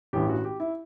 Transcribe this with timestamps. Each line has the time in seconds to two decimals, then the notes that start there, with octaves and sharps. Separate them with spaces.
0.13 A1 G2 E3 G4
0.29 F#4
0.45 G4
0.60 E4